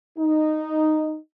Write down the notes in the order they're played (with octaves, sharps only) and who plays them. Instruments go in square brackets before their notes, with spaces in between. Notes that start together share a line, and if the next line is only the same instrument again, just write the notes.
[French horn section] D#4